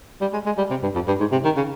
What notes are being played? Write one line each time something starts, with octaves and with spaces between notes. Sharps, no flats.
G3
G#3
G#3
G3
C3
G2
F2
G2
G#2
C3
D#3
C#3